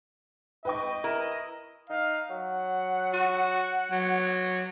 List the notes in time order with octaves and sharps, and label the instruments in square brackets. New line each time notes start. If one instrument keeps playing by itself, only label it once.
[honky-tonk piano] B4 G5 C#6 [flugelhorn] D#5
[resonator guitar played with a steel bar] E4 A#4
[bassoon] D#4 [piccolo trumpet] F5
[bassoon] F#3 [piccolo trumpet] F#5
[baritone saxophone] F#4
F#3